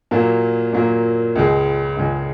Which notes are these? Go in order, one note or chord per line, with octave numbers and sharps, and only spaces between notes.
A#2 F#3 A#3
A#2 F#3 A#3
C#2 C#3 G#3
C#2 C#3 G#3